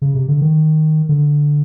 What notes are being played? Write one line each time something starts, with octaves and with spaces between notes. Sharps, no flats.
C#3
C3
D3
D#3
D3